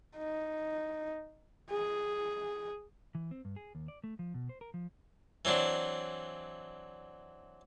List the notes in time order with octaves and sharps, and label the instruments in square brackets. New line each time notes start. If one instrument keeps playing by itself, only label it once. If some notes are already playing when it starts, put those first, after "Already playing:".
[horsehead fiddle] D#4
G#4
[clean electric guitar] E3
C4
G2
G#4
D#2
D5
A3
F3
B2
C5
A#4
F3
[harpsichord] E3 F#3 C4 D4